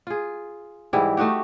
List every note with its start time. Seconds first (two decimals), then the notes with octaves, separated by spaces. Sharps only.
0.07 F4 G#4
0.93 G#2 E3 G3 E4
1.17 A3 D#4 F#4 G4